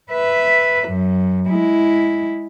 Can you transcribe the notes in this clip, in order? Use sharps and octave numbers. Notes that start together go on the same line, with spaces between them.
B4 E5
F#2
G#3 E4